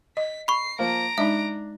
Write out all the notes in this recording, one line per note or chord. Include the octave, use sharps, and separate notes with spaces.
D#5 B6
B5 C#6 C7
F3 A#3 A#5 D7
G#3 D4 D#4 E5